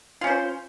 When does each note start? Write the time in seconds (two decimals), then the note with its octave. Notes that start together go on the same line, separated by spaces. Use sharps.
0.21 F4
0.24 C#4
0.27 C5